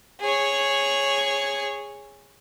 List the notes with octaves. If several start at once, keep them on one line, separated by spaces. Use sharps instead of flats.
G#4 C#5